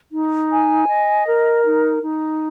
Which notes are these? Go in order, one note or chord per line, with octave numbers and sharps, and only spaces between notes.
D#4
G#5
D#5
A#4
D#4
D#4